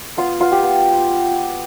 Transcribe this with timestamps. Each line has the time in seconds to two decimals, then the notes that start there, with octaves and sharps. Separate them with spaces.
0.17 B3 F4
0.40 B3 F4
0.52 G4
0.63 B3